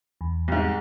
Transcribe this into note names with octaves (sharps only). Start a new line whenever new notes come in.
E2
C2 G#2